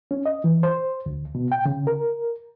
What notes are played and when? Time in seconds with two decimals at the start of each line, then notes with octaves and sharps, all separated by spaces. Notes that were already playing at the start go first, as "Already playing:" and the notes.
0.11 C#4
0.26 D#5
0.44 E3
0.63 C5
1.06 D2
1.35 B2
1.52 G5
1.65 C#3
1.87 A#4